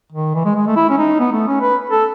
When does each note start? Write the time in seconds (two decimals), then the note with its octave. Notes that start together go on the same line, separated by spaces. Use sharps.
0.13 D#3
0.35 E3
0.45 G#3
0.56 G#3
0.67 A3
0.76 E4
0.90 C#4
0.98 D#4
1.20 B3
1.33 A3
1.48 C#4
1.61 B4
1.90 A4